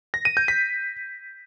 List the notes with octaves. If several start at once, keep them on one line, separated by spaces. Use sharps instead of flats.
A#6
D#7
G6
B6